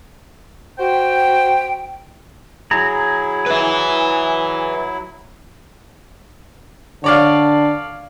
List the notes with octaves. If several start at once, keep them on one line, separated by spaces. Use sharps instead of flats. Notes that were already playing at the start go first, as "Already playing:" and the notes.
F#4 C5 G5
F#3 E4 G#4 A#5
B4 E5
D3 C#5 D5 F5